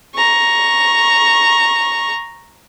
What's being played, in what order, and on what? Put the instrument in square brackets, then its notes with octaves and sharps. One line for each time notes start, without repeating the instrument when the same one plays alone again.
[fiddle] A#5 C#6